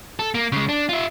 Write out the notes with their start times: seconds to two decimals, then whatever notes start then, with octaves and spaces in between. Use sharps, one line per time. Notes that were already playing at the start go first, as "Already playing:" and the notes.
0.19 A4
0.35 A#3
0.52 C#3 G#3
0.69 D4
0.89 F4 E5